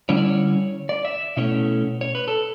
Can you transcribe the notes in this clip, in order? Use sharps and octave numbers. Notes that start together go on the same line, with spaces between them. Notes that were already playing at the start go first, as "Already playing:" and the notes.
D3 G3 C#4 E4 C#5
D5
C#5
D5
E5
B2 A3 C#4 E4 C#5
C#5
B4
A4